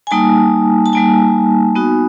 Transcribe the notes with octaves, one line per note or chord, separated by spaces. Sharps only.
G#5
G3 A#3 D#4 A5
A5
G3 A#3 D#4 G#5
B3 D#4 F#4